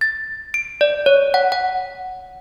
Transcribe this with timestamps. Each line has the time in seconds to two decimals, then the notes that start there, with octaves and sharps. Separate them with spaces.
0.01 A6
0.54 D7
0.81 D5
1.06 C#5
1.34 F#5
1.52 F#5